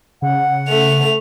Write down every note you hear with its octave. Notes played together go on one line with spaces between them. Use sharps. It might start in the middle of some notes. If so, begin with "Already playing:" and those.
C#3 F#5
A3 F7